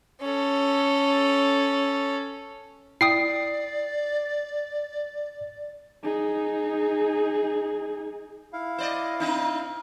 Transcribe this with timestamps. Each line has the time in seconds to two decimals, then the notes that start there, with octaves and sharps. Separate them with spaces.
0.21 C#4 A4
3.01 E4 D5 G5 D#6 C7
6.03 D#4 G#4
8.53 E4 F5
8.78 C5 D5 D#5
9.20 C4 D4 D#4